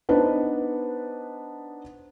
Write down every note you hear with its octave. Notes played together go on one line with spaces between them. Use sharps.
B3 D4 D#4 B4 C5 F#5